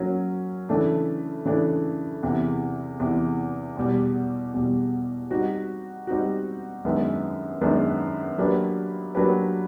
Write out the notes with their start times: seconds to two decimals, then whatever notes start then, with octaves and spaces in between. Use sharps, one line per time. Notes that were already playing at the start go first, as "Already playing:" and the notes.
Already playing: F#3 A#3 C#4
0.69 C#3 E3 A3 D4
1.45 C#3 E3 A3 D4
2.23 E2 C3 E3
3.00 E2 C3 E3
3.77 E2 B2 G3
4.54 E2 B2 G3
5.30 G3 C4 D#4 F#4
6.07 G3 C4 D#4 F#4
6.85 F#2 D#3 G#3 B3 D4
7.61 F#2 D#3 G#3 B3 D4
8.38 F#3 A#3 D4 G4 B4
9.15 F#3 A#3 D4 G4 B4